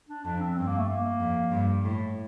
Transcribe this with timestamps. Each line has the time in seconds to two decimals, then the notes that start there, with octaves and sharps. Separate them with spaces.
0.09 D4
0.24 F2 D4
0.40 C4
0.56 G2 C4
0.67 A#3
0.78 A3
0.88 A#3
1.20 F2
1.51 G2
1.84 A2